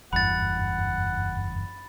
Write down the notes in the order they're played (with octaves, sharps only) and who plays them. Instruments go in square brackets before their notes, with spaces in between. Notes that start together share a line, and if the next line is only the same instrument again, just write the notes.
[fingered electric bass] F#1 E2 G2 [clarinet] F#5 [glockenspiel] B5 A6